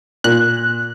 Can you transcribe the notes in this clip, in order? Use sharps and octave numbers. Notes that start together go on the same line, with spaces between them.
A#2 F#6